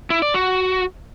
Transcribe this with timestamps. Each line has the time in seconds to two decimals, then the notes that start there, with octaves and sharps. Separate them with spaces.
0.10 E4
0.22 D5
0.34 F#4